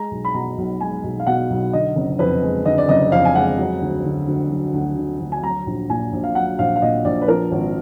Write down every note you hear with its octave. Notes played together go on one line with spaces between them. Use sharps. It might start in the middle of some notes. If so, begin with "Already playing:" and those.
Already playing: G#3 A#5
B1
B5
B2 A#5
B1
G#3 G#5
B1
F5
B2 F#5
B1
D3 D#5
F#1
F2 B4
G#3
D3 D#5
D5
F#1 D#5
F2 F5
G#5
G#3 F#5
F#3
D2
D3
D2
F#3
D2
D3
D2
G#5
F#3 A#5
A#1
A#2 G#5
A#1
F5
F#3 F#5
A#1 F5
F5
A#2 D#5
A#1 D5
B4
F3 A#4
G#1